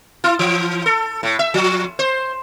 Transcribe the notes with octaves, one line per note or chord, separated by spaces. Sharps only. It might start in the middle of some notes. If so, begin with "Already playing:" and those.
E4
E3
A4
A2
E5
F3
C5